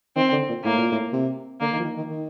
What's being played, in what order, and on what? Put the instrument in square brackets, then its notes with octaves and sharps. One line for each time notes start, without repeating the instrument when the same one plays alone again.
[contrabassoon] D#3 [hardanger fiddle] C4
[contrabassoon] D3
A#2
[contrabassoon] A2 [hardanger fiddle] A#3
[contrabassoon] A#2
A2
C3
[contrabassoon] D3 [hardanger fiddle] A#3
[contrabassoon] D#3
F3
D#3
D#3
D#3